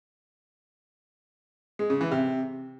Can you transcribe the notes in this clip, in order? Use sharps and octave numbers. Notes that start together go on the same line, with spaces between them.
G#3
C#3
E3
C3